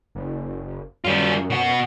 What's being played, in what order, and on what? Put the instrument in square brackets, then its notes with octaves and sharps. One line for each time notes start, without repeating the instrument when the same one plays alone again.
[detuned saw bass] F#1
[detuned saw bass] F#2 [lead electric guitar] G3 F4
[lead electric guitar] B2 F#5